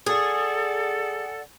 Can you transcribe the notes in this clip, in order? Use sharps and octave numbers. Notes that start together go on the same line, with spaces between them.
G#4 A4 D5 F#5